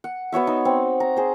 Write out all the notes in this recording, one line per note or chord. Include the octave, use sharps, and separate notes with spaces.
F#5
B3 F#4 C#5 E5
D#4
C4
A#5
G#4 C5